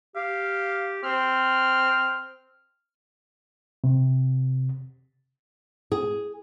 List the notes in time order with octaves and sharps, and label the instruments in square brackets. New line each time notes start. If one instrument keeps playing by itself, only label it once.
[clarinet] G4 [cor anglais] F5
[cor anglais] C4 [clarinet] F6
[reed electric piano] C3
[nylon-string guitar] G#4